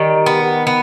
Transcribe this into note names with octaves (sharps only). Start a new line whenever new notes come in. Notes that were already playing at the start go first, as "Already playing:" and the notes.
Already playing: D#3 G3
B3
B3